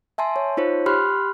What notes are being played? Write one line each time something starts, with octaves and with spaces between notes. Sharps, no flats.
E5 G#5 A5 C6
C#5
D#4 F4 C5 C#5
G4 B5 C6 F6 F#6